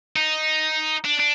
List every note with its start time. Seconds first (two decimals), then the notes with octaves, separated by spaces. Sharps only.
0.16 D#4
1.05 D4
1.20 D4